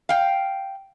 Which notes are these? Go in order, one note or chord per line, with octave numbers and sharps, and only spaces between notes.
F5 G5